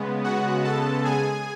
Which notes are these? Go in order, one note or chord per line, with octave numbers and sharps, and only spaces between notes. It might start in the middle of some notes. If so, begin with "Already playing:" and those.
Already playing: C#3 G#3 B3
F#4 F#5
A4 A5
G#4 G#5